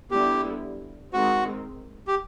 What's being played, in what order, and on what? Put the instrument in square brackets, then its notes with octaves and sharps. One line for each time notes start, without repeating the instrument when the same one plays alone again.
[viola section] D3 G3 B3 E4 [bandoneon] G4
[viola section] D#3 G#3 C4 [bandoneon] F#4
[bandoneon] G4